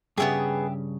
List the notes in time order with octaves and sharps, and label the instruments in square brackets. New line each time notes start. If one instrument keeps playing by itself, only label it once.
[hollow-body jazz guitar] G2 C#3 [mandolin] B3 C#4 G#4 [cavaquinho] G4 E5